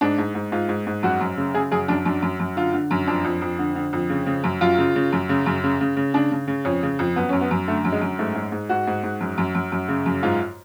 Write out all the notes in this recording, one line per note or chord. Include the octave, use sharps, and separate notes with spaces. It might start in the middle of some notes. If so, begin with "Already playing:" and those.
G#2 D4
G#2
G#2
G#2 F4
G#2
G#2
F#2 F#4
F#2
C#3
C#3 G#4
F#2 G#4
F#2 D4
F#2 D4
F#2
F#2
D3 F4
D3
F#2
F2 D4
F2
F2
D3
D3
F2
C#3
C#3
F#2
F#2 F4
C#3
C#3
F#2
C#3
F#2
C#3
C#3
C#3
C#3 D4
C#3
C#3
F2 C#4
C#3
F2
F#2 B3
F#2 C#4
B3
F#2
D3 A3
F#2
G#3
F#2
G#2 A3
G#2
G#2
G#2 F#4
G#2
G#2
F#2
F#2
F#2
F#2
C#3
F#2
G#2 F4